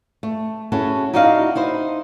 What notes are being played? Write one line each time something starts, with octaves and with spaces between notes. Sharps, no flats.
A3
C#4 E4 F#4 G#4 A4
D#4 E4 F#4 D5 D#5 F5
D#4 E4 C5